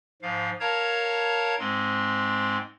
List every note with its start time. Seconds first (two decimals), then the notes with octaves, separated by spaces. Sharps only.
0.22 G#2 F3 F5
0.60 A#4 C#5 F5 A5 A#5 G#6
1.59 G#2 G#3 C4 C6